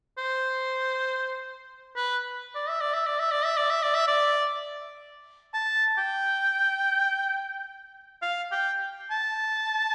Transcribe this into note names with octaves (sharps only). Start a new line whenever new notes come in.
C5
B4
D5
E5
D5
E5
D5
E5
D5
E5
D5
E5
D5
E5
D5
A5
G5
F5
G5
A5